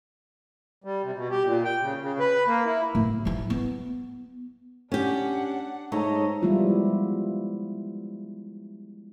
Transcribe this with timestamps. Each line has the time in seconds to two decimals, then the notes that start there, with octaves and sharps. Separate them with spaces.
0.84 G3
1.04 C3
1.15 B2
1.31 G4
1.44 A#2
1.64 G5
1.81 C#3
2.02 C#3
2.19 B4
2.47 A#3
2.65 E4
2.95 A2
3.25 F3 E4
3.50 B3
4.92 C#4 D4 G4 F#5
5.92 G#2 A3 A4 C#5 D#5 A#5
6.42 F3 G3 G#3 B3 E4 F4